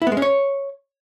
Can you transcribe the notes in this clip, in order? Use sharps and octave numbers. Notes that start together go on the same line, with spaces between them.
E4
B3
G#3
C#4
C#5